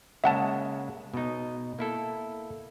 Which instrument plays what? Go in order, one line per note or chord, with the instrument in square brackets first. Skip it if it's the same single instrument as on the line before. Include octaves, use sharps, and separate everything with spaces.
[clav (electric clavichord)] C#3 G#3 A#3 [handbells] E5 F#5 A5
[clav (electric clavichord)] B2 D#4
A#3 E4 A4